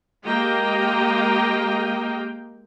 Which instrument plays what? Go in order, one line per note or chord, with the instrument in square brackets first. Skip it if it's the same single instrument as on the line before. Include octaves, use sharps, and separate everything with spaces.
[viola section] G#3 A#3 G4 D#5 F5 G5